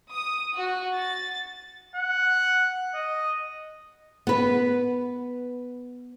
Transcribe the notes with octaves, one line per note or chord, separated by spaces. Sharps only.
D#6
F#4
A6
F#5
D#5
B3 B4